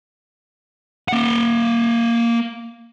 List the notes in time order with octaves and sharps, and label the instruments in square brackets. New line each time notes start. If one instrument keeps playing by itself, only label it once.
[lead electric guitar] A#3 F#5